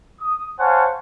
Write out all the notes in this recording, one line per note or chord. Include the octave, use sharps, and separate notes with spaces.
D#6
C5 C#5 F5 F#5 G#5 A5